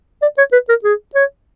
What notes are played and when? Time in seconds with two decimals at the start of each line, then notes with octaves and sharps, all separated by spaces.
0.22 D5
0.38 C#5
0.52 B4
0.69 A#4
0.84 G#4
1.15 C#5